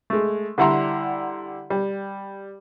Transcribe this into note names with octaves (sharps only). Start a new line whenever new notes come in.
G#3 A3
D3 G3 E4 F#5 A#5 C6
G3